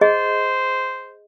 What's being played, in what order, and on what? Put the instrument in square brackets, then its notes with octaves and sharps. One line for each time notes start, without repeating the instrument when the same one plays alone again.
[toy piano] G#4 D#5 [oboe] C5